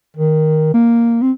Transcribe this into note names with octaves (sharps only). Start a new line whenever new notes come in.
D#3
A#3
C4